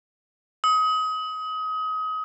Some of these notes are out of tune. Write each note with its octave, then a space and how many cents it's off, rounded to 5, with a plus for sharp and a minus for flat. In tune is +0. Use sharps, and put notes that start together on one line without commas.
D#6 +30